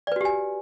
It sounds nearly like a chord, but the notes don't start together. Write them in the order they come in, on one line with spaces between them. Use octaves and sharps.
D5 B4 F#4 G4 G#5